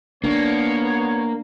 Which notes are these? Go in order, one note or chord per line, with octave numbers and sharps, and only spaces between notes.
A#3 B3 D4 C#5